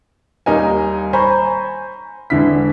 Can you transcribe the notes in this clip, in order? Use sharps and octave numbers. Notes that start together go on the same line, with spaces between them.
D#2 G3 D#4 A#4 G#5
C5 G#5 A#5 B5 C#6
E1 D3 E4 B6